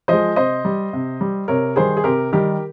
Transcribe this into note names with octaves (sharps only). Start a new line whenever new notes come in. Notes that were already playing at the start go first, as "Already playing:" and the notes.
F3 G#3 C5 D#5
C3 C5 D#5
G3
C3
G3
C3 A#4 C#5
D#3 G3 G#4 C5
G#4
C3 G4 A#4
D#3 G3 G4 A#4